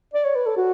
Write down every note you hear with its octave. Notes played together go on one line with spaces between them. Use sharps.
D5
C#5
B4
A4
F#4